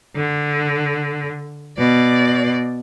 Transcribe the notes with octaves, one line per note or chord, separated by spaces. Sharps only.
D3
B2 D5